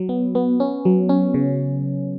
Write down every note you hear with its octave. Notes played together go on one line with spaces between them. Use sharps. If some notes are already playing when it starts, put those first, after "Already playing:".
Already playing: F#3
B3
B3
C#4
F#3
C#4
C#3